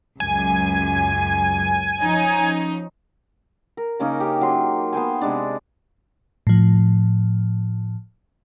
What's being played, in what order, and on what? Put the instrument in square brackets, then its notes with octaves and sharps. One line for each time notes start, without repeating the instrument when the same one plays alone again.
[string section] C#2 F#2 [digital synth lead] G#5
[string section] F3 C#4 D#4
[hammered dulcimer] A#4
C#3 A#3 C#4 D#4
G4
F#3 C6
B3 C5 G5 G#5
C3 G#3 D4
[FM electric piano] A2 F3